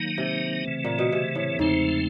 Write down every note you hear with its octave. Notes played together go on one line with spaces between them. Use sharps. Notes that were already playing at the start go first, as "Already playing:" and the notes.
Already playing: D#3 F#3 A#3 D#4
C3
C#3 E3 A3
A#2
B2
C3
A2
E2 G#2 C#3 F3 A3 C4